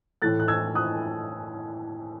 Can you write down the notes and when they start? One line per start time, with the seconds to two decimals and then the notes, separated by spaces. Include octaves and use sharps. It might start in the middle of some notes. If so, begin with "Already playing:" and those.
0.22 A2 E3 A3 F#6 A6
0.40 F#6
0.48 E6 G#6
0.75 D#6 F#6